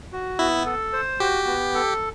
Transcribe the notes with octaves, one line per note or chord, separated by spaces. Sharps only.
F#4
B3 E4
A4
C5
F#4 G4
B3
A4